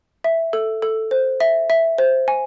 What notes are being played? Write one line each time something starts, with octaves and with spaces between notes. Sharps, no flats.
E5
A4
A4
C5
E5
E5
C5
G#5